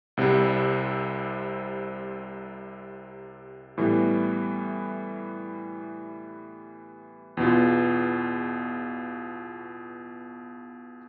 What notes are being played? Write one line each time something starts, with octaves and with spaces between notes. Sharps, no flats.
C2 C3 G3 C4
A2 E3 G3 B3
E2 B2 B3 F4